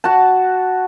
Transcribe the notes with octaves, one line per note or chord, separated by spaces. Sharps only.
F#4 A5